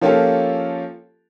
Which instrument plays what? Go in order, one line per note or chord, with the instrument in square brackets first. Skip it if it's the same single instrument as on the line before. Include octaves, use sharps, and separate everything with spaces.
[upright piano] F3 A#3 C#4 F4 G4 A4